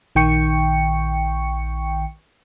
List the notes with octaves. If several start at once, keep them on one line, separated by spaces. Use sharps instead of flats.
A#1 D#3 G5 C#6 C#7